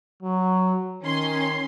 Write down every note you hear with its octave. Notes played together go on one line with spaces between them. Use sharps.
F#3
D#3 C#4 C6